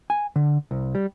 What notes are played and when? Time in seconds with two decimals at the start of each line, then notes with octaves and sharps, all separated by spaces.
0.10 G#5
0.36 D3
0.71 C2
0.95 G3